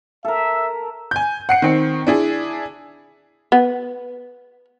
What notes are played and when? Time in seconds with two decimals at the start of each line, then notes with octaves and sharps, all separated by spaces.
0.25 A4 A#4 E5
1.11 G#5 G6
1.49 F#5 C7 C#7
1.62 D#3 C4
2.07 D4 E4 G#4
3.52 B3